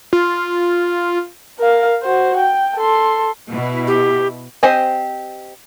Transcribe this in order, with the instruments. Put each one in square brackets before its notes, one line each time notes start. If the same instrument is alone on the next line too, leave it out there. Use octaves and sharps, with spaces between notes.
[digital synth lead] F4
[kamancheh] A#4 F5
F#4 C5
G5
A4 C6
[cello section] B2 E4
[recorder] G4
[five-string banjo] C4 G4 C5 D#5 G#5